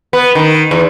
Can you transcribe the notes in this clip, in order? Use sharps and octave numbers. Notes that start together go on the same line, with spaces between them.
B3
D#3
E2